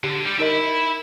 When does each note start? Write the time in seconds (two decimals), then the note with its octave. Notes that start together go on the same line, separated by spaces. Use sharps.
0.04 D3 G4
0.24 G3
0.39 D#4 A#4 D#5 E5 B5